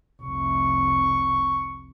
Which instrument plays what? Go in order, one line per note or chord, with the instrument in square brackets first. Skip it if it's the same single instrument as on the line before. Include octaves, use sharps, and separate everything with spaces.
[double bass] F1 C2 [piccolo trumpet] C#6